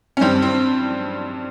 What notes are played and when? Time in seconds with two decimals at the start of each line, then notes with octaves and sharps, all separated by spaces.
0.17 C#4
0.21 G2 D#3 G3 C4
0.42 C4